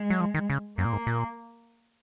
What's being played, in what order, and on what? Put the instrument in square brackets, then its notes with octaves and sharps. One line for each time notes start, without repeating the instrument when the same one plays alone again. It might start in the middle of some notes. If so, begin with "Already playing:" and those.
Already playing: [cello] G#3
[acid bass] F#3
F3
D#3
C#3
[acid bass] F#2 [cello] A#3
[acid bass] A#2
G#2
A#2